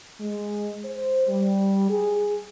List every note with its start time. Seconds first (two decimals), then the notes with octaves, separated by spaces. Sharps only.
0.20 G#3
0.84 C5
1.27 G3
1.90 G#4